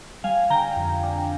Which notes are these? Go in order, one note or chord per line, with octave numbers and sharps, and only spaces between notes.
G3 F5 G#5
D3 G5 A#5
F2
D4